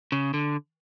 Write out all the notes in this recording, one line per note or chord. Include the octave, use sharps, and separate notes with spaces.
C#3
D3